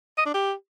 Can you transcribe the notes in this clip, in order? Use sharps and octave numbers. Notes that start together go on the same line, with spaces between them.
D#5
D4
G4